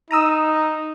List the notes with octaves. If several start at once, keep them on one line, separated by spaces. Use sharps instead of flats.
D#4 A#5 D#6 E6